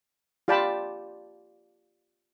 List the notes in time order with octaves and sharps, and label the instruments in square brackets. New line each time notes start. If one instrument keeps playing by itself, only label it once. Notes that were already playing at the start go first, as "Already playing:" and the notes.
[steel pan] F4 G4 D5 G5 A5 B5